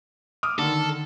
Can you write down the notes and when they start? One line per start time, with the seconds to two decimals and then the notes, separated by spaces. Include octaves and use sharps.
0.43 D6 D#6 F6
0.59 D3 D#3 A4